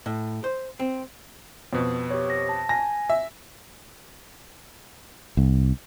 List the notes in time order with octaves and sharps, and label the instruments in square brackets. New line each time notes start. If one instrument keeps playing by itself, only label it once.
[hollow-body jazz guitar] A2
C5
C4
[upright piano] F2 B2
[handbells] G4 C#5
A#6
A5
[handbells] G#5 [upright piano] A#6
[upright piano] E5
[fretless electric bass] C2